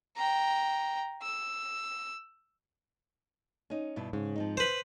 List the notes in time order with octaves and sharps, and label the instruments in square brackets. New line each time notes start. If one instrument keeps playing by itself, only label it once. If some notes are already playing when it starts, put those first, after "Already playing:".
[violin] G5 A#5
E6
[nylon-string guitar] C#4 D#4
G2 B2 E4
[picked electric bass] G#2 [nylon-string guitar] C#3
[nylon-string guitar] F3 C4 D#4
[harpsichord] B4 C5